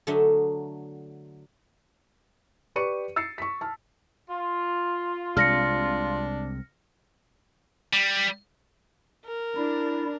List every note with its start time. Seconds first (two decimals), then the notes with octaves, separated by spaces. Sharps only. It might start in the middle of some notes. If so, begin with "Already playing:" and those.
0.07 D3 F#3 A3 D4 D#5 E5
2.76 G4 B4 D5 C#6 C#7 D#7
3.16 E6 A6 C7 C#7
3.38 C#6 B6
3.61 A5 F6
4.30 F4
5.37 C2 C3 G#3 D4 F6 A#6 C#7
7.93 G3
9.26 A#4
9.57 D4 E4